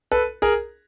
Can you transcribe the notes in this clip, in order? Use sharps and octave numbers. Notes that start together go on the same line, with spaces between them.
A4 B4
G#4 A#4